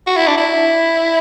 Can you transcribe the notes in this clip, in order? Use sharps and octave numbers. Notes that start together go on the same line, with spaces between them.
F#4
E4
D4
E4